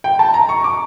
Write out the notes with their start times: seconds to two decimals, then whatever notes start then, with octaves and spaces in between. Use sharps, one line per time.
0.04 G5
0.19 A5
0.34 A#5
0.49 C#6
0.64 D6